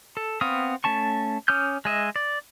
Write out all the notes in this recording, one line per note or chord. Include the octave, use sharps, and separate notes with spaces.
A4
B3 C4 F5 C#6 D#6
A3 C#4 A5 C#6
C#4 D6 D#6 F6 G6
G#3 D#5 E5
D5